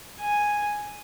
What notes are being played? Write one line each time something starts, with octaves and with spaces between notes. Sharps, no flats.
G#5